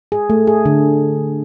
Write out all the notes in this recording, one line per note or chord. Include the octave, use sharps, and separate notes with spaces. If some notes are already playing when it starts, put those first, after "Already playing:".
G#4
A3
G#4
D3